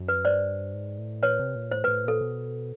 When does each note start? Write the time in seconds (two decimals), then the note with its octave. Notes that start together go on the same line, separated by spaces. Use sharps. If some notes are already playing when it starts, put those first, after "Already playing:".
Already playing: F#2
0.08 B4
0.24 G2 C5 D5
0.74 G#2
0.99 A2
1.23 A#2 B4 C#5
1.39 C3
1.55 A#2
1.71 A2 C5
1.84 B4
1.88 A2
2.05 A#2 A4
2.21 B2